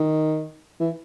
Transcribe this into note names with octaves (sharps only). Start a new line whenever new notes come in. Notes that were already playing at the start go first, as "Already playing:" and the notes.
Already playing: D#3
E3